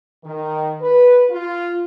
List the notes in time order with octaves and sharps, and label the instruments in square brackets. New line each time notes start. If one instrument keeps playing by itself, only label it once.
[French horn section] D#3
B4
F4